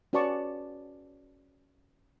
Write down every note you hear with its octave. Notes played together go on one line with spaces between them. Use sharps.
C#4 F#4 B4 D5 A5 C#6